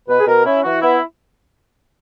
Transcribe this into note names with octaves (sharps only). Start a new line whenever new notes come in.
B2 B4
G#4
B2 A#4
C#4 E4
E3 F#4
B3 E4